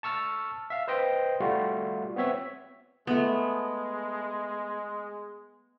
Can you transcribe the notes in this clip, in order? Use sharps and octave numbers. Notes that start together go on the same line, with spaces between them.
A5 C#6 E6 F6 A6
E5 F5
B4 C5 D#5 G5
G3 A3 F4 F#4
B3 C4 C#5 E5
G#3 A3 B3